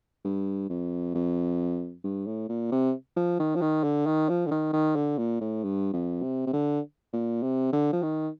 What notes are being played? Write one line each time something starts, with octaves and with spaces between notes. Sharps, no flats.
G2
F2
F2
G2
A2
A#2
C3
F3
D#3
F3
D#3
D3
D#3
F3
D3
D#3
D#3
D3
A#2
A2
G2
F2
C3
C3
D3
A#2
C3
D3
F3
D#3